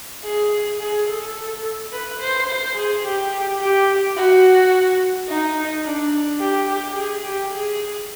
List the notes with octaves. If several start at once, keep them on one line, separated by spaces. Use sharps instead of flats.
G#4
G#4
A4
B4
C5
C5
G#4
G4
G4
F#4
D#4
D4
G4
G4
G#4
G4
G#4